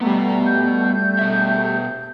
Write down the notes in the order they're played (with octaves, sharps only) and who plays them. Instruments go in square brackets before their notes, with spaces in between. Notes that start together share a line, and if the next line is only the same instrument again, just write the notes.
[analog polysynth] G3 A3 [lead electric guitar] B3 F#4 [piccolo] A#5
[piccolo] G6
[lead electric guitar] B2 E5